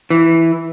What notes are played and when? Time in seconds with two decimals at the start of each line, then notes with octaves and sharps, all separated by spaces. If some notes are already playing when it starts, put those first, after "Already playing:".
0.10 E3